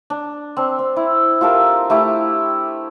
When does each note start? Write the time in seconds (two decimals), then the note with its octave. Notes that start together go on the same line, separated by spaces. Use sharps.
0.10 D4
0.57 C4 D4
0.79 C4
0.96 E4
1.41 F4 G4 A4 A#4
1.90 A3 E4 G4 E5